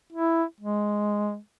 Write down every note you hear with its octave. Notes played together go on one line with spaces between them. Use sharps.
E4
G#3